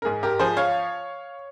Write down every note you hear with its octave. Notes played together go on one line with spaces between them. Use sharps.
A#4
G#2 G#4
G4 A#4
F3 G#4 C5
C#5 F5